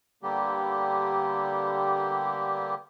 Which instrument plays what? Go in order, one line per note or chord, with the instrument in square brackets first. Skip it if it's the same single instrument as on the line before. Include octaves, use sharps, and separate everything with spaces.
[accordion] D3 G3 A#3 B3 G4